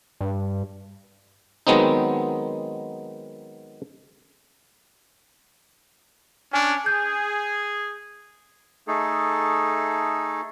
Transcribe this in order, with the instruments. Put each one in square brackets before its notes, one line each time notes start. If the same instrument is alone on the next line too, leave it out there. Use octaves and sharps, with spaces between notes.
[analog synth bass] G2
[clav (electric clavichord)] D#3 F#3 G#3 B3 C4 D#4
[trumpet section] C#4 D4 [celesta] G#5 F6
[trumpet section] G#4 [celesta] G6
[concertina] A3 D#4 G#4 A4